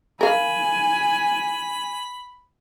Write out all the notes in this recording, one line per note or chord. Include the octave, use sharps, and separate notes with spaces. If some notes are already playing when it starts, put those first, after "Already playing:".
A#4 F5 G#5 B5